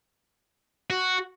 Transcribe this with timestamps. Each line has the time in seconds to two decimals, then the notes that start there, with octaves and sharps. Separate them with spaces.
0.90 F#4